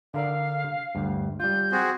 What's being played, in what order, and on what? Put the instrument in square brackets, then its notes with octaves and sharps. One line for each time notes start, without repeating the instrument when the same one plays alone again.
[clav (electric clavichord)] D3 A#4 D5 [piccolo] F5
[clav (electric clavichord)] D2 G2
[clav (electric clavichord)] G3 F4 [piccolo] G6
[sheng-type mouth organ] C4 F#4 G#4